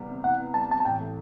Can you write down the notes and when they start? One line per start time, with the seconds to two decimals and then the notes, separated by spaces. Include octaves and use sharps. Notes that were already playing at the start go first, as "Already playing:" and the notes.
Already playing: C2 G3 B3
0.09 C3
0.24 C2 F#5
0.40 B3
0.54 G3 A5
0.69 C3 A5
0.80 A5
0.85 A1 G5
1.00 A3